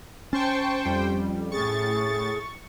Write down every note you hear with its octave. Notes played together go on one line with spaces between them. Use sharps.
C#4 C5 G5 A5 C6 C#6
F2 G3
A2 G#4 C#6 A6